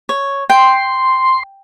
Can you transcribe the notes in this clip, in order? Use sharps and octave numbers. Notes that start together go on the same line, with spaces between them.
C#5
G5 C6